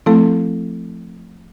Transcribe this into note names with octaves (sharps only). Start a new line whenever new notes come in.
F3 A3 C4 E4 A4